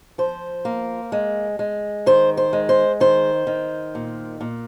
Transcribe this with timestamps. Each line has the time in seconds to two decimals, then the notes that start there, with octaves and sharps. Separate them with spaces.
0.18 F3 C5
0.65 A#3
1.12 G#3
1.59 G#3
2.06 D#3 C5
2.37 C5
2.53 G#3
2.69 C5
3.00 D#3 C5
3.47 D#3
3.95 A#2
4.41 A#2